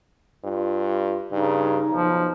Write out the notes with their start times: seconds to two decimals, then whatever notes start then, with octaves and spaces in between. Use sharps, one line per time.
0.44 G2 F4
1.32 G2 C#3 D#4
1.90 B1 F3